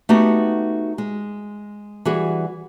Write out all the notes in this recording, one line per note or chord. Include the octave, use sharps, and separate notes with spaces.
A3 B3 D#4 F#4 G4
G#3
E3 G3 F#4 G#4